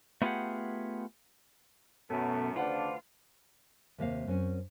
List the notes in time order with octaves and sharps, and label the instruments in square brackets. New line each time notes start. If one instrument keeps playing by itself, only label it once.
[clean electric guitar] A3 B3 F4 G4 G#4 F#5
[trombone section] F#2 [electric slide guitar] B2 A3 B3 [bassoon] A4
[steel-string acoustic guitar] D2 B4 F#5 [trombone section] C#3 D4 [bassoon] F3 [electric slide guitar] F4
[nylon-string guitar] D#2 C3 A#3 F5
F#2 C4 C#4